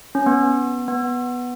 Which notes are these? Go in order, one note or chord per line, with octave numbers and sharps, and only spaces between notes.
C#4
B3
B3